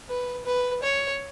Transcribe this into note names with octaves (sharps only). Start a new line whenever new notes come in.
B4
B4
C#5